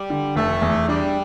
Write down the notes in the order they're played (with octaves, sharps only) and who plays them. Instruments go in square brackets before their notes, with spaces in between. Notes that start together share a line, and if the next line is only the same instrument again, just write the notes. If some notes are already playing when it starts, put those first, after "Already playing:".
Already playing: [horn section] G3
[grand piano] D3
[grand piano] F1 [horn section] A3
[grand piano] E2
[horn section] G3 [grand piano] D4